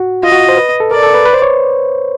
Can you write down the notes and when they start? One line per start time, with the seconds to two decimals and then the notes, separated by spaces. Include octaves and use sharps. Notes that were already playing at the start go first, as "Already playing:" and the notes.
Already playing: F#4
0.23 F4 D#5
0.32 F#4
0.49 C5
0.57 B4
0.80 A4
0.91 A#4 D5
1.03 A4
1.14 B4
1.26 B4
1.33 C5
1.42 C#5